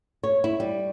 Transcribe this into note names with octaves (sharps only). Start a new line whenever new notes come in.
C#5
E4
G3